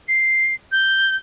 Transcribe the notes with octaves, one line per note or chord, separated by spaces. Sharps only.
C7
G6